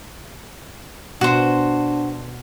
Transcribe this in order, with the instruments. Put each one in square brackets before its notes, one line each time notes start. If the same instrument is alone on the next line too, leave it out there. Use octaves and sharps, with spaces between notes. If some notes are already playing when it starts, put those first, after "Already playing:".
[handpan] B2 B3 [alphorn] D4 [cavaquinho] F#4 C5